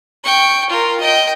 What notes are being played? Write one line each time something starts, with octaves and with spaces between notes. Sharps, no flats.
G5 C#6
F4 A#4
D#5 G5